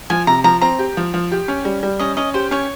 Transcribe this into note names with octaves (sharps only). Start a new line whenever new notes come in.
F3 G#5
C3 A#5
F3 A#5
C4 A#5
G4
F3
F3
G4
C#4
G3
G3
C#4 D#5
C#4 D#5
G4 C5
C#4 C#5